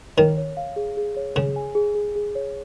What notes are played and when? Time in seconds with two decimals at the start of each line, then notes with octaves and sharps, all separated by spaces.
0.17 D#3 C#5
0.37 C#5
0.57 F5
0.76 G#4
0.97 G#4
1.16 C#5
1.35 C#3 G#4
1.56 G#5
1.75 G#4
1.95 G#4
2.16 G#4
2.35 C#5